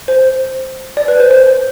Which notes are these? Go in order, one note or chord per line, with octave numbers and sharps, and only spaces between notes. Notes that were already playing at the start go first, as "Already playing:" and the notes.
C5
D5
B4
C5
C5